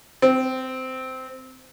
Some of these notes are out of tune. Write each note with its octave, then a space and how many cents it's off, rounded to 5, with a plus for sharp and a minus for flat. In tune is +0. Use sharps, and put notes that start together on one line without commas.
C4 -15